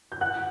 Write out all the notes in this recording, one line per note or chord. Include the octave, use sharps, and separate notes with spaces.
G6
F#5 F#6